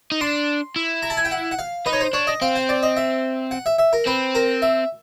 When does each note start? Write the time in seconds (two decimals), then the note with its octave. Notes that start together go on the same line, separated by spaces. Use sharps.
0.12 D#4
0.21 D4 C6
0.76 E4
1.03 A#5
1.10 A5
1.17 G#5
1.25 G5
1.31 F#5
1.51 F#5
1.59 F5
1.86 D#4 B4
1.93 C#5
2.01 C5
2.13 D4 C#5
2.27 D#5
2.42 C4 F5
2.56 G5
2.69 D5
2.83 D#5
2.97 E5
3.51 F#5
3.66 E5
3.79 E5
3.93 A#4
4.07 C4 B4
4.35 A#4
4.62 E5